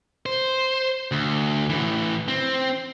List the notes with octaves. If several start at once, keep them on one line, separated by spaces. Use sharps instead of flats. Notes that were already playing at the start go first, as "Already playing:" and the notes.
C5
D2
A2 E3
C4